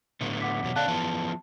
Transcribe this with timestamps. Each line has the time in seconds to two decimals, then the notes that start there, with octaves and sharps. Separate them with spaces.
0.21 A2 D3 B3
0.41 F#5 D6 B6
0.63 E2 B2 F#3
0.76 D3 C4 D4 F5 A5 F#6
0.88 E3 F3 B3 A5